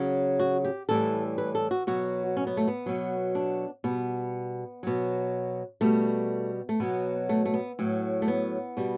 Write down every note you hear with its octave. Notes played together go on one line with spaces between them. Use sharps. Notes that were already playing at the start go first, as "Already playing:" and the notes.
Already playing: C#3 F#3
F#4
G4
A2 E3 G3 A4
B4
A4
F#4
B2 F#3 F#4
C#4
B3
A3
B3
B2 F#3
D4
B2 G3 B3
B2 F#3
B2 G3 A3
A3
B2 F#3 B3
A3
A3
B3
A2 F#3
A3
B3
B2 G3